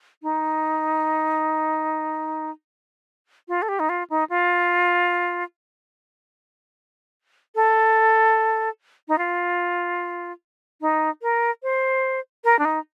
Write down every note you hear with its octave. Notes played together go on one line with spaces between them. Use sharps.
D#4
F4
A4
G4
D#4
F4
D#4
F4
A4
D#4
F4
D#4
A#4
C5
A#4
D4
D#4